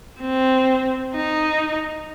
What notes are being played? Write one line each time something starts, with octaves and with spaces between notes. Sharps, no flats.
C4
D#4